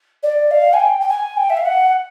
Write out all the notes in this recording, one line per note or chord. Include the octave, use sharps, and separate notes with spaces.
D5
F5
G#5
G5
G5
G#5
G5
E5
F5
F#5